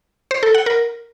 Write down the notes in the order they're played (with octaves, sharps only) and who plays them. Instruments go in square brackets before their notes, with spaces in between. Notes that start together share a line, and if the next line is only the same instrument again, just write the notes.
[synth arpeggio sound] C5
A4
F#5
A#4